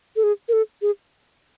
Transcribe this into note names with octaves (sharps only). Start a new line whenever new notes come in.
A4
G#4
A#4
A4
G#4